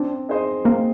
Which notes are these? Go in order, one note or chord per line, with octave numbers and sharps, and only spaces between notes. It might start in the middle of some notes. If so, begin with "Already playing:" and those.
Already playing: C4 D4
D#4 G#4 C5 D#5
A#3 C4